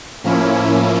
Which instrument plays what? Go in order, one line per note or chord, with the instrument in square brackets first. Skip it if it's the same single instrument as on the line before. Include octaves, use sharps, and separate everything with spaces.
[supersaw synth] A2 F3 A#3 C#4 E4